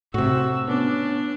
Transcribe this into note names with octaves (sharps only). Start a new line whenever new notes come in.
A2 C3 F#4 E6
B3 C#4 D4